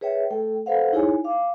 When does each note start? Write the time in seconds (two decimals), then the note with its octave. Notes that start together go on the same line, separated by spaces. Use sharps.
0.01 G#4 B4 C#5 E5 G5
0.31 A3 A4 G5
0.66 A4 B4 C5 F5 F#5
0.92 D#4 E4 G#4 C#5 G#5
1.24 F5 G5 D6